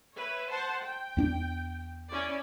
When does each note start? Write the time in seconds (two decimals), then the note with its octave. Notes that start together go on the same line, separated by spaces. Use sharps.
0.17 B4 C#5 E5
0.49 C5 F#5 A5
0.83 G5
1.17 E2 C4 D4
2.10 C#4 E4 D5